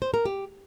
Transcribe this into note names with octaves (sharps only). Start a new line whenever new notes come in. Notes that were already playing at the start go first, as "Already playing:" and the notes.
C5
A#4
G4